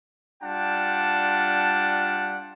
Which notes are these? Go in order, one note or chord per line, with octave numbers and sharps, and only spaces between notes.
G3 D4 F4 F#5 G5 A5